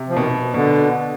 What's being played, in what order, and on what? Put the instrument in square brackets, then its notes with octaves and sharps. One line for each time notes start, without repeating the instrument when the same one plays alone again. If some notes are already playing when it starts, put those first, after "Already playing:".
Already playing: [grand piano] C3
[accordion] F3
[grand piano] B2 [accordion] D#3
[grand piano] B2 [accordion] D3